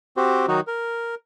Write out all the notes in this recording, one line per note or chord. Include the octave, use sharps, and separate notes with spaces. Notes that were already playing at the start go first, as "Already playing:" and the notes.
C4 F#4 G4 C5
D#3 F#3 D#4 F#4
A#4